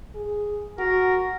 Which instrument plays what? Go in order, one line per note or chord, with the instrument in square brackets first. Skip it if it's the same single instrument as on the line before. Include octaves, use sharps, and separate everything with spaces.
[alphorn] G#4
[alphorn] F#4 [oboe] A#4